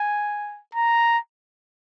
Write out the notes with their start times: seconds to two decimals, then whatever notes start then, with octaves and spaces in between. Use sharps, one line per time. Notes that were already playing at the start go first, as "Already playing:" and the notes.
Already playing: G#5
0.75 A#5